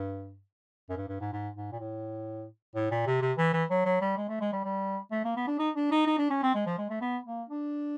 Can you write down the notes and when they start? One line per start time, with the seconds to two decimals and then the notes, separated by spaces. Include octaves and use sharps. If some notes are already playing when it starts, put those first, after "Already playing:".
Already playing: G2
0.90 F#2
0.97 G2
1.08 G2
1.21 G#2
1.33 G#2
1.56 G#2
1.72 A#2
1.80 A2
2.75 A2
2.91 A#2
3.06 C3
3.22 C3
3.38 E3
3.53 E3
3.70 F#3
3.85 F#3
4.01 G3
4.17 G#3
4.29 A3
4.41 G#3
4.53 G3
4.65 G3
5.11 A3
5.25 A#3
5.36 B3
5.47 D4
5.59 D#4
5.76 D4
5.92 D#4
6.07 D#4
6.18 D4
6.30 C#4
6.43 C4
6.55 G#3
6.67 F3
6.78 G#3
6.90 A3
7.01 B3
7.26 A#3
7.49 D4